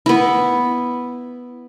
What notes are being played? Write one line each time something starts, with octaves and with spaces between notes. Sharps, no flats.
B3 E4